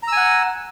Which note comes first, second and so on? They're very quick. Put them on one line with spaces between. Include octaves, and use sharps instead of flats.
A#5 E6 G#5 F#5